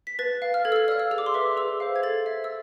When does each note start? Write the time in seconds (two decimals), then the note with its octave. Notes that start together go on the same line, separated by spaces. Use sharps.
0.07 B6
0.19 B4 A6
0.42 F5
0.54 F6
0.65 A4 G#6
0.72 E6
0.76 F6
0.88 D5 F5 F6
0.99 E6
1.11 G#4 E6
1.18 D6
1.26 C6
1.34 B4 E5 D6
1.57 G#4 E6
1.80 C5 F5
1.96 G#6
2.03 A4 A6
2.26 E5
2.44 E6